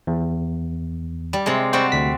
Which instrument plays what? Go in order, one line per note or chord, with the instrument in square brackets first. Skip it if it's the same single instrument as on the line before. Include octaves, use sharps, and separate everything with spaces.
[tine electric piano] E2
[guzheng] G3
C3 G#3
[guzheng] G3 C4 F#4 [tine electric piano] C5 C#6
[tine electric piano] D2 B6